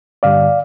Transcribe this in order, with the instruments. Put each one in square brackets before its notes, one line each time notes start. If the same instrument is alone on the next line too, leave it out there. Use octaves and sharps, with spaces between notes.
[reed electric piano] G2 D3 G3 D5 F5